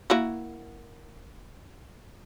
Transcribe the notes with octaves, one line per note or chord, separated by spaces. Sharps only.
A#3 E4 F#4